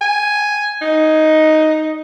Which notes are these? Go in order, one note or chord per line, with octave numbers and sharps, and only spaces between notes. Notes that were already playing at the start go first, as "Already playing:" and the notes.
G#5
D#4